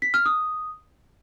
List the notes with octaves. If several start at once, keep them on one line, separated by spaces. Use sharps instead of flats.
B6
F6
D#6